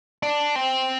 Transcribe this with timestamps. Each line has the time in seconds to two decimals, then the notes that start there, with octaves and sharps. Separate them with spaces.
0.23 D4
0.56 C4